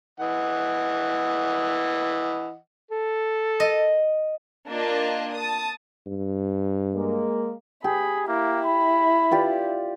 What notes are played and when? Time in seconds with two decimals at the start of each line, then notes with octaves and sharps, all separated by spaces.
0.20 E3 D#5 F#5
2.91 A4
3.60 D#5
4.70 A#3 D4 F4 A#4 D#5
5.33 A5 D#6
6.06 G2
6.94 G#3 A#3
7.84 G4 G#4 B5
8.28 A#3 E4
8.65 B5
9.31 F4 G4 D5